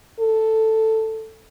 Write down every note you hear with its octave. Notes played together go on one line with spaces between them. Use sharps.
A4